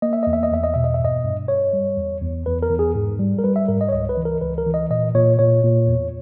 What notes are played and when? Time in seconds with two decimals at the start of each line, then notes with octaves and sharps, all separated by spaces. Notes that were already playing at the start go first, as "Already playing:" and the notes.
0.02 A#3 D#5
0.13 E5
0.23 E2 D#5
0.33 E5
0.43 D#5
0.51 E2 E5
0.64 D#5
0.74 B2 E5
0.84 D#5
0.94 E5
1.00 G2 D#5
1.25 G2
1.48 G2 C#5
1.73 G3
1.97 E2
2.22 E2
2.46 E2 B4
2.63 A#4
2.71 E2
2.79 G#4
2.95 G#2
3.19 G3
3.39 A#4
3.44 G3 B4
3.56 E5
3.68 G#2 A#4
3.81 D#5
3.89 C#5
3.92 C#2 D#5
4.09 B4
4.17 E3
4.25 A#4
4.41 C#2 B4
4.58 A#4
4.66 E3
4.74 D#5
4.90 A#2 D#5
5.15 A#2 C#5
5.39 A#2 C#5
5.64 A#2
5.88 E2